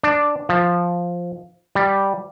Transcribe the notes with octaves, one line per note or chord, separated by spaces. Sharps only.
D4
F3
G3